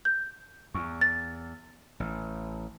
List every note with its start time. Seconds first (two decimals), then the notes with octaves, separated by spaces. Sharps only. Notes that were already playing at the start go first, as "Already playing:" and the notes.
0.05 G6
0.74 E2 C#6
1.01 A6
2.00 A1